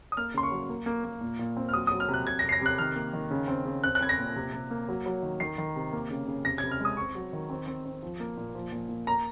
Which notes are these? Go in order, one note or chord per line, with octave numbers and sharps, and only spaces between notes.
D#6
A#3 F6
C#3 C6
C#6
F#3
A#3
A#3
A#3
A#2
A#2
C4
F6
F#3 D#6
F#3 D#6
F6
C3
F#6
C3 G#6
A#6
C3
C7
A#6
C3 F#6
D#3 F6
A#3
D#3
C#3
C4
C#3
C4 F#6
F#6
C4 G#6
A#6
A#2
C3
C3
A#3
F#3
F#3
D#3
D#3 C7
D#3
C3
A#3
C#3
C#3
C3 A#6
C3 G#6
F6
G#3 D#6
C4 C#6
F#3
D#3
C4
C4
C4
F3
A#3
A#2
F3
A#2
A#2
A#3 A#5